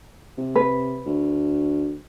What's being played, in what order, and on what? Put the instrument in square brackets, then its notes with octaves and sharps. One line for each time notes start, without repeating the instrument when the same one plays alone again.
[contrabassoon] C3
[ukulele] B4
[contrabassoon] D2